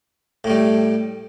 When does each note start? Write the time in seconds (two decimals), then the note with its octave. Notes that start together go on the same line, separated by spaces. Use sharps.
0.44 A2
0.47 A3
0.50 G3